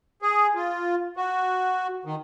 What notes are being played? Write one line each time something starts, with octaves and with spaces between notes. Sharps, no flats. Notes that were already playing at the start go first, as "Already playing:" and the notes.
G#4
F4
F#4
D#3